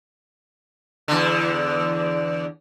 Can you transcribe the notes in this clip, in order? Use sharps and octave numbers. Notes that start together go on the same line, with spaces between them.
E2 D3